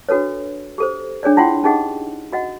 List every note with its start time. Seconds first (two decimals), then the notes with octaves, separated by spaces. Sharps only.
0.09 D4 F#4 A4 B4 C#5
0.78 G4 A4 C5
1.23 D4 G#4 C#5 D5
1.37 E4 F4 F#5 G5 C6
1.63 C#4 D#4 G4 G#4 D#5 F#5
2.33 F#4 D#5 F#5